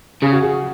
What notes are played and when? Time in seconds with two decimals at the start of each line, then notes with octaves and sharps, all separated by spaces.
0.22 C#3 G#4
0.33 F#4
0.43 G#4